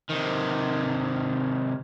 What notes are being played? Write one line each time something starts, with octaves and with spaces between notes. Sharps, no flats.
C3 D#3